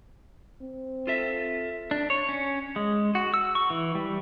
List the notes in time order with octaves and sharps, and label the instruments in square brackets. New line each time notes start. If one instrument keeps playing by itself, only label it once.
[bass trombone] C4
[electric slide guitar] F4 A4 E5
[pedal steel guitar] D4
C#5
C#4
G#3
F#4
E6
C#6
E3
G3